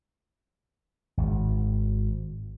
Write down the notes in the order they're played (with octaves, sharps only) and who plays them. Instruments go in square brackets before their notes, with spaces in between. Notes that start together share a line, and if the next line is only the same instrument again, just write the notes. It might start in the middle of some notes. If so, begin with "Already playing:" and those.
[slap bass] G#1